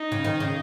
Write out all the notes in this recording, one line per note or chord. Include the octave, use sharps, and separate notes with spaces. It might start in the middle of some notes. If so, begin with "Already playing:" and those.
Already playing: D#4
C#3
D#3
C#3